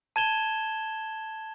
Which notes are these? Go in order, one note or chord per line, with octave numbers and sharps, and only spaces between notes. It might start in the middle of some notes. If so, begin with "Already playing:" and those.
A5 G#6 E7 G7